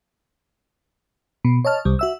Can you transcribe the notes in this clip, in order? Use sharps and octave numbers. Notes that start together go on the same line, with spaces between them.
B2
C#5 D#5 A5 F6
C2 G3
F#4 E5 E6